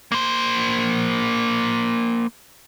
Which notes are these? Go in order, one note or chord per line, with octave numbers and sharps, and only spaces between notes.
A#3 C5